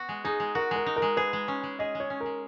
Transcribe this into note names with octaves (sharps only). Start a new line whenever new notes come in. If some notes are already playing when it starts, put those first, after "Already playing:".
Already playing: B3 F#4
G#3
D#4 G#4
G#3
F#4 A#4
G#3 A#4
D#4
A#4
G#3
G#4 B4
G#3
C#4
G#3
G#4 D#5
G#3
C#5
C#4
A#4
G#3